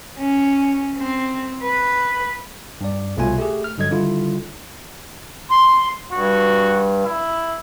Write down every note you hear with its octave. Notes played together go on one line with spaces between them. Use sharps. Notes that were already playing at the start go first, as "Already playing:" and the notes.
C#4
C4
B4
G2 D5
C2 B2 A3 F4 G#5
A3 G4 G#4
F6
G2 D3 F#3 D#5 G#6
D3 D#3 G3 E4 F4
C6
G2 F#4
E4